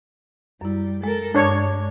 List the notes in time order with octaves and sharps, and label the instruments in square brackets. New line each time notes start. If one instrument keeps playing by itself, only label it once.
[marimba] F#2 E4 [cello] G3
[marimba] G#3 [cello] A4 A#4
[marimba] G2 [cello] G#3 [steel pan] D4 C#5